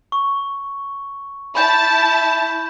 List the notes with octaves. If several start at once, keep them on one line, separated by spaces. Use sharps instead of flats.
C#6
E4 A5 B5 G6